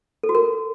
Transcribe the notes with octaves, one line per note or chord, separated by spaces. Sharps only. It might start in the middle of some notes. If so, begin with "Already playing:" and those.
A4
F#4
A#4